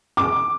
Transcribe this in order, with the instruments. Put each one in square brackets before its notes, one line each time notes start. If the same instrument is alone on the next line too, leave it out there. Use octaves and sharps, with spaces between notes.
[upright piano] D6